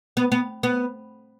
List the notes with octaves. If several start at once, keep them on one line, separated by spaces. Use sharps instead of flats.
B3
B3
B3